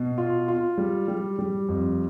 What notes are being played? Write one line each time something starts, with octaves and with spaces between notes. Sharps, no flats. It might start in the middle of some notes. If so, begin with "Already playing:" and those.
Already playing: B2
F4
F4
G3
G3
G3
F2